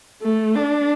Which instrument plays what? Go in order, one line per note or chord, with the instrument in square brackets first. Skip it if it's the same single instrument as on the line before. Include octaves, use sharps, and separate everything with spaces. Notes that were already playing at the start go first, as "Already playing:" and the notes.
[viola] A3
D4